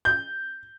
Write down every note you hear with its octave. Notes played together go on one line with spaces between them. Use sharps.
G6